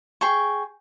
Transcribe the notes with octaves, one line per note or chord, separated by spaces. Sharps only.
G#4 G5 C#6